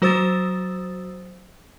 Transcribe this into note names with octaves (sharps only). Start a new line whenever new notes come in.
F#3 F#4 C5 D#6 E6 A6